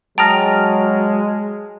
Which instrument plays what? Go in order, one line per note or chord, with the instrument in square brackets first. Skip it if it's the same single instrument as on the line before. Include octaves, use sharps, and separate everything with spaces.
[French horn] F#3 [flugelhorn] G#3 [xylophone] G5 A#5 A#6 [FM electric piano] A5 D#6 F6